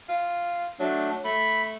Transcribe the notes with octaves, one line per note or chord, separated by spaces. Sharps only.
F4
F#3 A3 D4
A3 B5